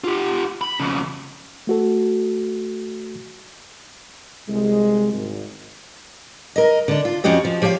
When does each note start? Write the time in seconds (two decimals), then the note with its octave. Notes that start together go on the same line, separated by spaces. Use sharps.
0.04 F4 G4
0.61 B5
0.79 F2 C#3
1.67 A3 F#4 A4
4.48 C2 G#3
5.13 G#1
6.56 A#4 D#5
6.88 D3 D4
7.05 F4
7.24 F2 F3 C#4 F#4 G4 D#5
7.45 F3
7.62 F3 G4 C#5 E5 F5